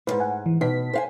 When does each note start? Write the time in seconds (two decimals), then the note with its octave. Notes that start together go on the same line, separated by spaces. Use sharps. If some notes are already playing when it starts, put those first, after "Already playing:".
0.07 D2 G#2 B4
0.20 F#5 G#5
0.46 E3
0.61 B2 D#4 B6
0.93 C5 F5 G#5